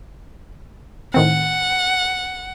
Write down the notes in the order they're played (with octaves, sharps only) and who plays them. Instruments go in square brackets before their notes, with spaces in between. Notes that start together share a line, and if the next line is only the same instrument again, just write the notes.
[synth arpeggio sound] A2 D#3 C4 [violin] F#5